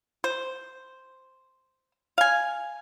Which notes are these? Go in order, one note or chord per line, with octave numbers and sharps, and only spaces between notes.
C5
F5 G#5